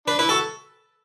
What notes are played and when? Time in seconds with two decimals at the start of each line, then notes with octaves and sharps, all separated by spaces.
0.08 D4 B4
0.19 E4 B4
0.29 F#4 A4